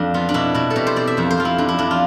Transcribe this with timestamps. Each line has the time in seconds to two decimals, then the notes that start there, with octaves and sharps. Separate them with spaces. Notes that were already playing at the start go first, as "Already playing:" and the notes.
Already playing: F2 D4
0.14 B3 F4
0.29 D4
0.34 B2 E4
0.54 B2 E4
0.70 A4
0.76 B2 G4
0.87 C5
0.96 C4 D5
1.07 E5
1.17 F2 C5
1.31 C5
1.38 F2 F4
1.45 E4
1.58 F2 D4
1.69 E4
1.78 F2 D4
1.91 F4